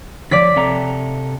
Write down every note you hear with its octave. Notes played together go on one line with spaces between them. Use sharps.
D3 F3 D5 B6
C3 A4 A#5